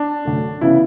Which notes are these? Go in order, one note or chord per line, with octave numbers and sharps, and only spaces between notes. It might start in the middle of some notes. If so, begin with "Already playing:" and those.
Already playing: D4
F#2 D3 A3
C#3 E3 B3 E4